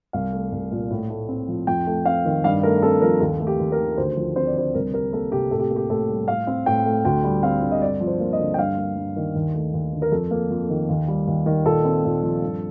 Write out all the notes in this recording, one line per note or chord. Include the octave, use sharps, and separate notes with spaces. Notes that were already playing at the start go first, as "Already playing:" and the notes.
C2 F5
A3
C2
A#2
A2
A3
C4
F3
F2 G5
A3
C4 F5
D#3
G2 F5
A3 A#4
C4 A4
F3 A#4
D#2 A4
A3
G4
D#2
A#4
D#3
D2 C5
F3
C4 C5
D5
D3 C5
C2 A#4
G3 A#4
A#3 A4
C3 G4
A2 A4
G4
A#3
G4
A2 A4
G3
A2 F5
C4
A2 G5
A3
D2 G5
G3
C4 F5
D3
D#5
G2 D5
F3
C5
A#3
D#5
D3
G5
G2 F5
A#3
G2
D#3
D#2
A3
D#2
D3
A#4
F2 A4
A#3
F2
D#3
D#2
G3
D#2
D#3
A#2 A4
C4
A#2
F3
G2